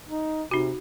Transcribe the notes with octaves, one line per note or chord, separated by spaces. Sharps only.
D#4
C3 D#4 F#4